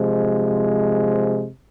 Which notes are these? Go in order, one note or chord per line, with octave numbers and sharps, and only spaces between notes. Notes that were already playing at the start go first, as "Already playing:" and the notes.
Already playing: C3 F3 G#3